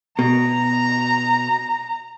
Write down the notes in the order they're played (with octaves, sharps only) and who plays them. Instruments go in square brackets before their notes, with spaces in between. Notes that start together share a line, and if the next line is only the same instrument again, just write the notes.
[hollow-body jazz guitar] B2 [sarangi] A#5